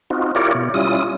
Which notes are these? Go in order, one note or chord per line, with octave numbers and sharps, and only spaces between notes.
C4 D#4 F4 F#4
E4 F4 G4 A#4 C#5 D5
B2
G3 C#4 E4 F4 D#6